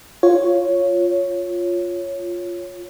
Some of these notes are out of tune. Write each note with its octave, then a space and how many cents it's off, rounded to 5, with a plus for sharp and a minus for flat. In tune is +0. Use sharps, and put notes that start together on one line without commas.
F4 +0 C#5 +0